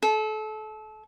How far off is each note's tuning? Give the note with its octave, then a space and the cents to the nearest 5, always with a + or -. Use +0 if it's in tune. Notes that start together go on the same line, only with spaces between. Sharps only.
A4 -30